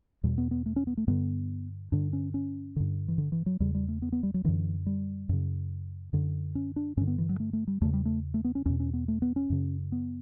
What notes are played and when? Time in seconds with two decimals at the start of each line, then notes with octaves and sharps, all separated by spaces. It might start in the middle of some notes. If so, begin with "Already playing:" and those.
0.24 E2 B2 G3
0.38 B3
0.51 B3
0.66 A3
0.76 C#4
0.87 B3
0.97 A3
1.08 G2 D3 B3
1.92 G2 D3 D4
2.13 C#4
2.34 C#4
2.76 G2 D3
3.08 E3
3.18 D3
3.32 E3
3.46 F#3
3.60 E2 C#3 G3
3.74 G3
3.88 A3
4.02 B3
4.12 B3
4.23 G3
4.34 F#3
4.44 F#2 D3 E3
4.86 G3
5.29 F#2 C#3
6.13 F#2 D3
6.55 C#4
6.76 D4
6.97 G2 C#4
7.01 D3
7.07 B3
7.18 E3
7.29 F#3
7.40 A3
7.53 A3
7.67 G3
7.81 E2 C#3 A3
7.94 G3
8.05 A3
8.34 A3
8.44 B3
8.55 C#4
8.66 E2 B2 C#4
8.80 C#4
8.93 B3
9.08 A3
9.22 B3
9.36 C#4
9.50 F#2 C#3
9.92 B3